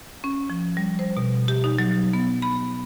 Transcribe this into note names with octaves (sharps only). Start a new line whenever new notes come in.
C#4
F3
G3
C5
B2
G4
D#4
F#3
B3
B5